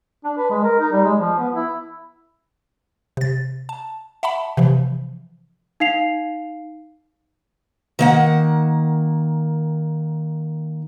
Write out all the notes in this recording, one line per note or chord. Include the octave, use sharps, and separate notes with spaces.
D4
B4
G#3
A#4
D#4
G3
G#3
F3
B3
E4
C3 A6
A5
E5 F#5 A5 B5
C3 E3 F3
D#4 F5 C7 F7
D#3 A#3 F#5